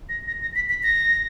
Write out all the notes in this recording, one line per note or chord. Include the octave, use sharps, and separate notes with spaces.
A#6
A#6
A#6
B6
B6
A#6